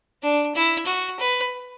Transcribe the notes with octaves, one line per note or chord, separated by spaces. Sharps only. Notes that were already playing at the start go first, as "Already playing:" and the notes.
D4
E4
F#4
B4